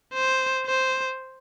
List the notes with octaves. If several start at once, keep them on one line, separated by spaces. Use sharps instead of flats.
C5
C5